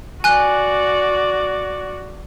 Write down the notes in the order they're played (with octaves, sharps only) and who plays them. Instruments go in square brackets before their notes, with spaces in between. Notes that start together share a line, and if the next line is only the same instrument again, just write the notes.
[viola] F#4 D5 [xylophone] G#5 F#6